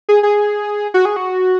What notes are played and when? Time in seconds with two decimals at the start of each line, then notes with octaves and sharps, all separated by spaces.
0.09 G#4
0.23 G#4
0.94 F#4
1.05 G#4
1.16 F#4